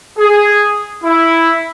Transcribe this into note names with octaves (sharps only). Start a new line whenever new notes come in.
G#4
E4